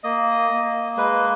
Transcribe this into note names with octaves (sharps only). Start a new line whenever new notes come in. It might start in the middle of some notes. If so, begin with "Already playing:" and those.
A#3 D#5
A#3
G#3 B4